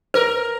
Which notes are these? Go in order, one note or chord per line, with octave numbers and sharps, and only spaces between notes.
A#4 B4